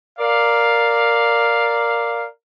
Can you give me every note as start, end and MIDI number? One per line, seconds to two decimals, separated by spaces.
0.18 2.26 70
0.18 2.26 74
0.18 2.26 77